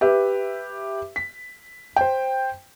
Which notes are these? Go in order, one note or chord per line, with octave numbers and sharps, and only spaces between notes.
G4 B4 E5
B6
C5 G5